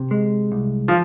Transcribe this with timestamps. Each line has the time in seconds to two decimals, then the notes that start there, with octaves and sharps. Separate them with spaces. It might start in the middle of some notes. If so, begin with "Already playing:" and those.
Already playing: C3
0.11 G#3
0.52 C2
0.88 F3